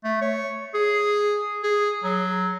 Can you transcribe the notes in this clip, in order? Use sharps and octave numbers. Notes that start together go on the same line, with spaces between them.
A3
C#5
G#4
G#4
F#3